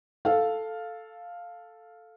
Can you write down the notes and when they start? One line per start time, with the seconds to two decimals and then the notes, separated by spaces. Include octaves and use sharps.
0.25 A4 F5